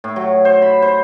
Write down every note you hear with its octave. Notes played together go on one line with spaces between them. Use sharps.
A2
F#3
C5
B5
C5